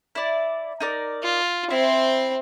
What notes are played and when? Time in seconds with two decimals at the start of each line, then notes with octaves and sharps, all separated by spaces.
0.15 E4 D5
0.80 D#4 A#4 D5
1.23 F4
1.70 C4 E4 C5